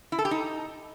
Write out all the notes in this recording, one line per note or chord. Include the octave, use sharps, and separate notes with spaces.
E4
A4
G4
D#4